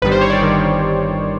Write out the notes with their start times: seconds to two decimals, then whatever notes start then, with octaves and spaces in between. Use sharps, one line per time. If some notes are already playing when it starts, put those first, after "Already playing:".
0.02 G1 G2 D#3 G3 B4
0.12 C5
0.21 C#5
0.30 D5
0.40 G1 G2 D#3 G3